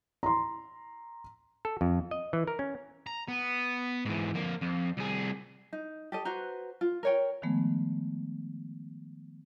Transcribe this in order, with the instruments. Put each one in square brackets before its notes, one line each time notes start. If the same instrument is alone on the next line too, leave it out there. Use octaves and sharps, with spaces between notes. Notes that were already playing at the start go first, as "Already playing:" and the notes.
[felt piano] A#5 C6
[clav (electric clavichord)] A4
F2
D#5
E3
A#4
C#4
[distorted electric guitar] A#5
B3
G#2 E3
F2 A#3
F2
C2 G#4
[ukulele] D#4
G4 A4 D#5
F#4 B4 C5 A#5
F4
A#4 C#5 G5
[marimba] D#3 F3 G#3 A3 B3